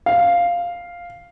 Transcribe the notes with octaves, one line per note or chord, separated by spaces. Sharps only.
F5